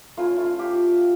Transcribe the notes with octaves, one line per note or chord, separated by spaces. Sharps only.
A3 C#4 E4 F4
F4
G4